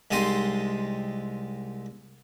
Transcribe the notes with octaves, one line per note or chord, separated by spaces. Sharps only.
C2 G#3 D#4 G4 A5 C6